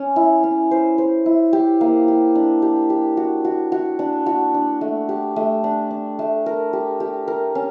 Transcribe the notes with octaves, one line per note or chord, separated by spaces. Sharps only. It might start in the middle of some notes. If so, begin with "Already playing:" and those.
Already playing: C#4
E4
C#4
C5
C5
E4
G4
A#3
G4
D4
G4
G4
F#4
F#4
F#4
D4
F#4
D4
A3
G4
A3
D4
D4
A3
A#4
G4
G4
A#4
C#4